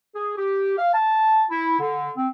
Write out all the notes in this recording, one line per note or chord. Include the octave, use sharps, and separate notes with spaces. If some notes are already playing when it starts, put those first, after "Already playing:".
G#4
G4
F5
A5
E4
D3
C4